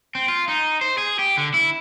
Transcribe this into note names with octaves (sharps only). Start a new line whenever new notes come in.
C4
F4
D#4
C5
G#4
G4
D3
E4